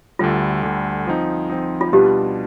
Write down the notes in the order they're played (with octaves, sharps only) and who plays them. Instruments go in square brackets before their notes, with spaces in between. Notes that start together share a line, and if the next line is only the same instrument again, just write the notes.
[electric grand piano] D2 D3 G3 [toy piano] F4
[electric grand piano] D2 D3 G3
F3 C4 D#4
F3 C4 D#4
[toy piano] F4
[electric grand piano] B2 G3 D4 F4 B4 [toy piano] G4